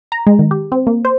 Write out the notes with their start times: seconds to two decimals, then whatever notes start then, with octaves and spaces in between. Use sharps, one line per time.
0.12 A#5
0.27 G#3
0.39 D#3
0.51 G4
0.72 C4
0.87 A#3
1.05 C5